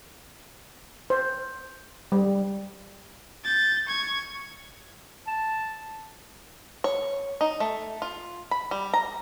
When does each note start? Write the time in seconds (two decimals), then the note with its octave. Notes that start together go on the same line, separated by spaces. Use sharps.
1.10 C5
2.12 G3
3.44 G6 A6
3.87 C#6 G#6
5.27 A5
6.84 C#5
7.41 D#4
7.60 A3
8.02 F4
8.51 B5
8.71 G3
8.94 A#5